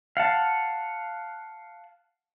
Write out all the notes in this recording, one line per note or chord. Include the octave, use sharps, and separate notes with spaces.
F5 F#5 A5